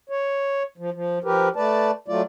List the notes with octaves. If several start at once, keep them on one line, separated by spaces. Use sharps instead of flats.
C#5
F3
F3
F3 G4 A#4 B4
A3 B4 D5 A5
F#3 A3 F4 D5